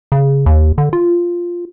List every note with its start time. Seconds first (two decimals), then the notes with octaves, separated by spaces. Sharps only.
0.12 C#3
0.46 D#2
0.78 D3
0.93 F4